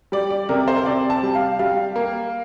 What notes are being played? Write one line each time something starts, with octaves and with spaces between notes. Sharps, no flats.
G3 D5
D5
C3 A#4
C5
C3 D5
A5
G3
F5
G3 F5
A#3